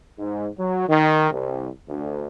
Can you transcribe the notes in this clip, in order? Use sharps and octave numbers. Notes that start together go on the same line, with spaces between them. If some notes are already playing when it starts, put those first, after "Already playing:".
G#2
F#3
D#3
C2
D2